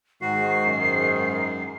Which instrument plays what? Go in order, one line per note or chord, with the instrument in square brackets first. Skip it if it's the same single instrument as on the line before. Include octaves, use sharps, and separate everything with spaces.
[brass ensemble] G#2 D#3 [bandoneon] F#4 [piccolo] C7
[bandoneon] F#2